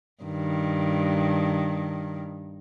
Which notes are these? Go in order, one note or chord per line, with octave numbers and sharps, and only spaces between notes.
G2 D#3